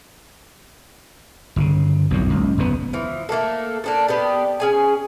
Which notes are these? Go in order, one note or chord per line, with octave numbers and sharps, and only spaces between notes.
G1 A#2 C#3
B1 F2 A2
F#1 C#2
F#1 E2 B2 B3
E3 F3
A3 A#3 F#4 A4
A#3 D4 A4
B3 D4 G4
C#4 G#4 G#5